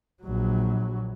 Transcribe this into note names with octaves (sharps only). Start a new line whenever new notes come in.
A#1 F#3